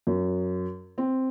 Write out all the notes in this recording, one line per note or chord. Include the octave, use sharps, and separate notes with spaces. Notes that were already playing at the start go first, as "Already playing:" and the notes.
F#2
C4